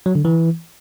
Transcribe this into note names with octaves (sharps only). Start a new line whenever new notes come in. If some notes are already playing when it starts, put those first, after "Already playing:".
F#3
D3
E3